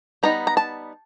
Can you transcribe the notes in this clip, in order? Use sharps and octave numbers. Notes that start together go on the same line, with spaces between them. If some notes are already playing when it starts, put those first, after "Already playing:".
G3 B3 D#4 A#5
A#5
A5